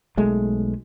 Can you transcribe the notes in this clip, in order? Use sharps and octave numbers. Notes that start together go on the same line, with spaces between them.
B1 G#3 A3